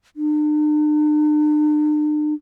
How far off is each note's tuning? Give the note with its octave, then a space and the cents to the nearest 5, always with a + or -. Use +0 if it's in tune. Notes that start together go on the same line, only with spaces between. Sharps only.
D4 +45